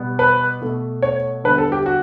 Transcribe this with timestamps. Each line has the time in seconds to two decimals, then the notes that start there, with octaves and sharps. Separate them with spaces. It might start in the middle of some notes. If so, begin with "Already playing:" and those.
Already playing: B2 G3 B3
0.19 B4
0.61 B2 A3
1.02 C#5
1.44 D3 G3 B3 B4
1.58 A4
1.72 G4
1.86 F#4